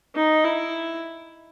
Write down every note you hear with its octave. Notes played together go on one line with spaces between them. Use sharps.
D#4
E4